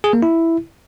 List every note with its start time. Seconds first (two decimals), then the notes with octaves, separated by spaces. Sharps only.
0.04 G#4
0.13 A#3
0.23 E4